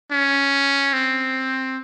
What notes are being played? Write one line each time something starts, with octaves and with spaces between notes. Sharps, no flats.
C#4
C4